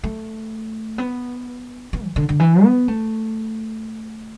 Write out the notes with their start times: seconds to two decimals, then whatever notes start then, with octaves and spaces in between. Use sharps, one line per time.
0.04 A3
0.98 B3
1.93 B3
2.04 E3
2.16 D3
2.29 D3
2.40 E3
2.64 B3
2.88 A3